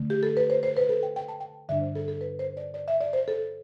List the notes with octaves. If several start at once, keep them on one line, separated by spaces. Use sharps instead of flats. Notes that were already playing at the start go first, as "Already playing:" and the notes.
Already playing: D3 A3
G4
A4
B4
C5
C5
B4
A4
G5
G5
A5
G5
G2 D3 G3 D4 E5
C5
A4
A4
B4
C5
D5
D5
E5
D5
C5
A4